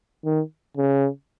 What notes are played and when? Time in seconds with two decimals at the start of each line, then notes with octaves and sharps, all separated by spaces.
0.25 D#3
0.77 C#3